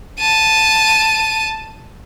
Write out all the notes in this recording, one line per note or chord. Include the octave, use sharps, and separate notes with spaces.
A5 D#7